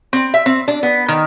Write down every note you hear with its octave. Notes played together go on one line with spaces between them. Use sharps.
C4
E5
C4
D4
B3
D#3